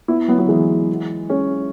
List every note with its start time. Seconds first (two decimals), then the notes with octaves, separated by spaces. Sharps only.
0.08 B3 E4
0.28 F#3 B3
0.38 F#3 B3
0.49 E3 G#3
1.30 G#3 C#4